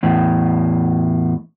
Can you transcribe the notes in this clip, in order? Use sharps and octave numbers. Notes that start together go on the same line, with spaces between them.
E2 A2